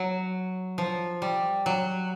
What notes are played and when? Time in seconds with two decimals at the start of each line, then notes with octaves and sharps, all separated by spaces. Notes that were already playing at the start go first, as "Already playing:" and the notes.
Already playing: F#3
0.78 F3
1.22 G3
1.66 F#3